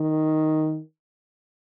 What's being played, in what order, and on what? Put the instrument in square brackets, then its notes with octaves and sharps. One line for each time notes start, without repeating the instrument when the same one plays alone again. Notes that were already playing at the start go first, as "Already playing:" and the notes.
Already playing: [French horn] D#3